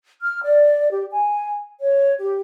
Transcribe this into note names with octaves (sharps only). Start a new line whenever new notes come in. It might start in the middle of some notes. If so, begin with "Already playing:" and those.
F6
D5
G4
G#5
C#5
G4